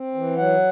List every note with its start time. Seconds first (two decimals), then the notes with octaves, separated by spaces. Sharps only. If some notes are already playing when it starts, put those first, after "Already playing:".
Already playing: C4
0.15 E3
0.37 F#3 F#5